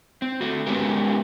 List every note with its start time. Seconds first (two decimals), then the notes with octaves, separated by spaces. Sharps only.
0.22 C4
0.41 A3 F#4
0.67 G#3 B3 C#4 G4 A#4